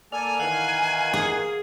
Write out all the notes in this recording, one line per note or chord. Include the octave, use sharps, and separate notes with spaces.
A#3 A4 D5 G#5 F6
D#3 E3 F5 F#5 F#6 G#6
G#4